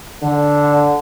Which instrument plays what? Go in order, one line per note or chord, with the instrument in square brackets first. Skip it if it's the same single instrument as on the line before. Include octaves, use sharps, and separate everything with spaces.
[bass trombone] D3